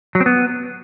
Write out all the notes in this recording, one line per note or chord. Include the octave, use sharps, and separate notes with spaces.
F#3
C4
B3